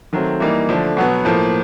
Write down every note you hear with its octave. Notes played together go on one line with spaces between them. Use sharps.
D#3 F#3 A3 C4
E3 G3 A#3 D#4
D3 F3 A3 D4
B2 F#3 B3
A2 F3 A#3